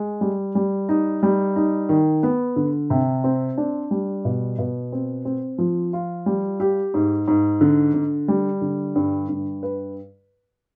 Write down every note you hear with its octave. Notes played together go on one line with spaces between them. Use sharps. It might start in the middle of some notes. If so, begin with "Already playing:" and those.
Already playing: G#3
G3
G3
D#4
G3
D#4
D#3
B3
D3
C3
C4
D4
G3
B2
B2
C4
C4
F3
F4
G3
G4
G#2
G#2
D3
D3
G3
D3
G2
G2
B4